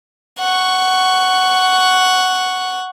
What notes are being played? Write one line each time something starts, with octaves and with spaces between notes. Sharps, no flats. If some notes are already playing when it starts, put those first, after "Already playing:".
F#5 C#6